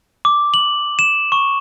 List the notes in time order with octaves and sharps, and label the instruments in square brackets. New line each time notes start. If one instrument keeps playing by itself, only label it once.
[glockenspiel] D6
F#7
E7
C#6